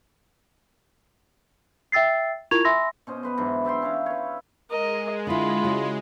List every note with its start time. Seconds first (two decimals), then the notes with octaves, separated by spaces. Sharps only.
1.92 E5 G5 E6 A6 C7
2.51 E4 F4 A#4 C#6 G#6 F7
2.65 E5 G#5 B5 C6 E6 A#6
3.07 B2 C#4 C5 D#5
3.23 B3 B4 C6
3.37 G#2 E3 F#3 D4
3.65 D5 E5 G5 C6
3.82 C#4 E5 F5 A#5
4.06 B4 C#5
4.70 G#3 A#4 D#5
5.27 D3 E4 F4 B5
5.64 C#3 E4 F#4